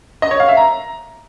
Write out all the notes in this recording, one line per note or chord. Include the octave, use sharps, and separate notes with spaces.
D#5
C#5
F5
E5
A#5